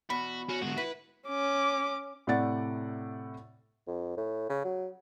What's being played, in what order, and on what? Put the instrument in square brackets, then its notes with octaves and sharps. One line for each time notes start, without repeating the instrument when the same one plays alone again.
[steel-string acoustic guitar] E2 B2 [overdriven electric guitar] F#4 [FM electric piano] B5
[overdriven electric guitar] C#4 [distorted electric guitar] F#4
[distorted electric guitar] G#2 D3 [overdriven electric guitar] F#4
[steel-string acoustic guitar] E4 [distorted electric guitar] B4 [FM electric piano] B6
[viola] C#4 D6
[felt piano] A2 C3 A3 D5 F#5 A6
[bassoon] F2
A2
C#3
F#3